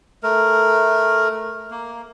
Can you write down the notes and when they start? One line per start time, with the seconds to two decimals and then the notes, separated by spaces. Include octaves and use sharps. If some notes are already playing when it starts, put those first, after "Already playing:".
0.23 A3 A#4
1.71 A#3